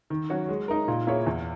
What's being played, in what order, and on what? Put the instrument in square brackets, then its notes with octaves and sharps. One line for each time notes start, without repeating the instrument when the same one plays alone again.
[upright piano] D#3
F#3 C#4 F#4 C#5
G#3
D#4 A#4
A#2
A#3 E4 G#4 C#5
E2